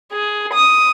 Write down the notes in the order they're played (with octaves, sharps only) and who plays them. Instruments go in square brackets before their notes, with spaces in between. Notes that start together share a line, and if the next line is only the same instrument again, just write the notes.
[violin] G#4
D#6